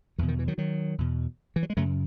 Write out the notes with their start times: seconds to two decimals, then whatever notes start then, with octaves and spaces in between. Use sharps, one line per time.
0.18 E2 B2 E3
0.28 D#3
0.39 E3
0.48 D#3 F#3
0.58 D#3 F#3
0.98 E2 B2
1.56 E3
1.63 F#3
1.70 G#3
1.77 F#2 C#3 F#3 A3